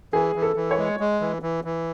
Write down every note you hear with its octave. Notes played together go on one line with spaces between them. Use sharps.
E3 G#4
E3
A4
E3
C#5
G#3
G#3
E3
E3
E3